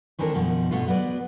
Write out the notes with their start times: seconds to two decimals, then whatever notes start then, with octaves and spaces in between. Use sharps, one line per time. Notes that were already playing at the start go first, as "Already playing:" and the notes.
0.19 D#3 E3 C4 D4 A4 A#4
0.34 F#2 B2 D#3 F3
0.71 G2 B2 A3 B3 F4
0.88 F#3 B3 B4 D5